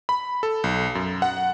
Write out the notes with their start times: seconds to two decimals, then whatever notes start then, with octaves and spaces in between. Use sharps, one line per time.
0.09 B5
0.43 A4
0.64 B1
0.95 F#2
1.22 F#5